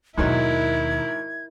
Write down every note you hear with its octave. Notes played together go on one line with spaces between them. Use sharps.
D#2 G#2 B2 D#3 F#3 E4 A#4 G#6